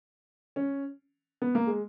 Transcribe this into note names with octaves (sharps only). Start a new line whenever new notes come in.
C#4
B3
A#3
G#3